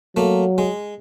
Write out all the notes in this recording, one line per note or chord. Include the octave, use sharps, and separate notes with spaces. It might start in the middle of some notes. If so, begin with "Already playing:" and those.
F#3 A3 A#3
G#3